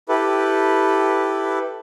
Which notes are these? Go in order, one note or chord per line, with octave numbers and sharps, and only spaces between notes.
E4 G4 A4 B4